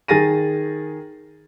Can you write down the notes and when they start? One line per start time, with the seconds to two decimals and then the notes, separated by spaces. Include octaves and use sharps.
0.08 D#3 G#4 A6 A#6 D#7